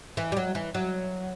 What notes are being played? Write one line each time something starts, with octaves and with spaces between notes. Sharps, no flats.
E3
G3
F#3
E3
F#3